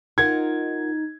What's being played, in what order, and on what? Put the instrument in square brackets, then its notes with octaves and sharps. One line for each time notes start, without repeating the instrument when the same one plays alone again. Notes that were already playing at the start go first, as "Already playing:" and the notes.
[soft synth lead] D#4 [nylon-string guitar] F4 A#4 F#5 [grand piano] G#6